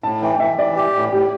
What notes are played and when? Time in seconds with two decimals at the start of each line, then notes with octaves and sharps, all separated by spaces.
0.03 A2 A5
0.22 E3 G5
0.34 G5
0.40 E3 E5
0.59 E3 D5
0.76 G4
0.95 A2
1.12 A2 G4